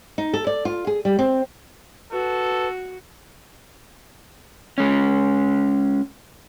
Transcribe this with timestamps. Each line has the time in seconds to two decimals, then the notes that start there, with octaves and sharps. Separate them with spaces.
0.18 D#4
0.34 A4
0.47 D5
0.65 F4
0.87 G#4
1.05 G3
1.19 C4
2.12 F#4 A4 B4
4.78 G#3 C#4